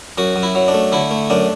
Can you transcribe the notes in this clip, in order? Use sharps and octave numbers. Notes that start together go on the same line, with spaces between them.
F#2 F#4
F#2
E4
F#3
D4
A3
D3 E4
A3
F#2 D4